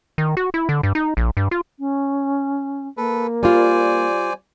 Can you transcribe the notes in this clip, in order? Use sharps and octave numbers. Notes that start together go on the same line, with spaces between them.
D#3
F#4
E4
D3
G2
D#4
A#1
G2
F4
C#4
A#3 A4 B4
G3 F4 C5 D5 G#5